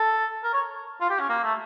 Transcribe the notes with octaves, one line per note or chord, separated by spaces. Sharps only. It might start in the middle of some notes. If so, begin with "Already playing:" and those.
Already playing: A4
A#4
C#5
F4
G4
C#4
A#3
A3